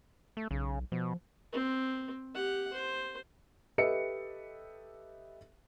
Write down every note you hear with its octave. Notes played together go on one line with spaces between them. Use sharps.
A3
B1 C#3
B2 F3
C4
G4 F#5
C5
G4 A4 B4 D#5 E5 C#7